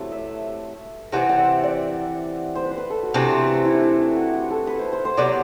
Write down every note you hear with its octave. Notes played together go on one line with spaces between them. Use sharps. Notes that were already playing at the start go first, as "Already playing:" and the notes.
Already playing: C3 F#3 A3 E4 A4 B4
E5
C3 E3 A3 C4 F#5
F#5
E5
D5
C5
B4
C5
B4
A4
F#4
C3 E3 A3 C4 D4
E4
D4
E4
F#4
F#4
A4
B4
C5
C5
C5
C3 F#3 B3 D5